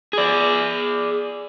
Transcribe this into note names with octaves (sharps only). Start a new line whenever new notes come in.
G#4 D5